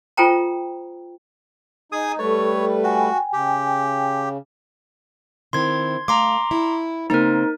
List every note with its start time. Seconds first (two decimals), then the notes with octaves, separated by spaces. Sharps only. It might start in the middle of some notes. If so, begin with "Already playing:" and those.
0.17 F4 A4 C5 G5 A#5
1.92 D#4 G#4 G#5 D#6
2.19 G3 A3 A4 B4 C#5
2.84 F#4 G5 G#5
3.33 C#3 G4
5.53 D#3 C4 E4 C6 G#6
6.08 A3 F5 A#5 C6 D6
6.51 E4
7.10 C#3 A#3 C4 D#4 A#4